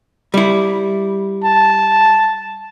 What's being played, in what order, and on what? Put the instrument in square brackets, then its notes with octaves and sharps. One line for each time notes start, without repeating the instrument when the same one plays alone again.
[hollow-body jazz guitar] G3 E4
[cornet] A5